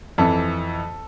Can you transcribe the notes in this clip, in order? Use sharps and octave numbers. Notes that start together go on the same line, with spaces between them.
F2 E3 A4